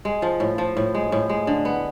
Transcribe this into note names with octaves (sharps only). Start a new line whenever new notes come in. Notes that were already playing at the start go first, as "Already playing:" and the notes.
G#3
F3
A2
F3
A2
G#3
A2
G#3
D3
B3